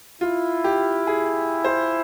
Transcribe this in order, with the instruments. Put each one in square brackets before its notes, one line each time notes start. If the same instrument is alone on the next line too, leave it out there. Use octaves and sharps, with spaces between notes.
[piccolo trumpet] E4 [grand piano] F4
[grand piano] G4
G#4
C5